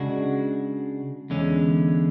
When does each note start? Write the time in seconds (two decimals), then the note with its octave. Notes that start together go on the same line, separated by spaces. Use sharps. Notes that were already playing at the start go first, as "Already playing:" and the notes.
Already playing: C#3 G#3 D4 F#4
1.30 E2 D3 G#3 C#4